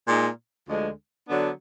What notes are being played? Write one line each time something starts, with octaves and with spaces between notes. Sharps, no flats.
A#2 G#3 D#4
D2 D3 F3 G#3
D3 F#3 B3 D4